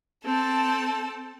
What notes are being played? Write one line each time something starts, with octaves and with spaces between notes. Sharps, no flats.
C4 A4 A5